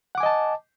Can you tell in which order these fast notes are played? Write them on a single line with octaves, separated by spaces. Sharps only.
F#5 D6 G#5 D#5 A5